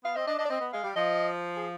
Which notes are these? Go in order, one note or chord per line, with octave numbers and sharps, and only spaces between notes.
B3 F5
C4 D#5
D4 D#5
D4 D#5
D5
C4 D#5
B3
G#3 F5
G3
F3 D#5
G#4